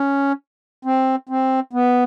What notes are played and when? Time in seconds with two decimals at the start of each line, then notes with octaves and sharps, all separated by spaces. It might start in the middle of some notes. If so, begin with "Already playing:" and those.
Already playing: C#4
0.85 C4
1.29 C4
1.73 B3